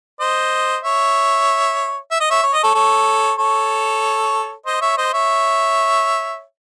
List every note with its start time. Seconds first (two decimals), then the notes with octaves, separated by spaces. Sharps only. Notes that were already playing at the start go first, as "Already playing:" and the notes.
0.20 C5 D#5
0.84 C#5 E5
2.11 E5
2.21 D#5
2.30 C#5 E5
2.43 C#5
2.53 D#5
2.63 A4 C#5
2.75 A4 C#5
3.38 A4 C#5
4.66 C5 D#5
4.81 C#5 E5
4.97 C5 D#5
5.13 C#5 E5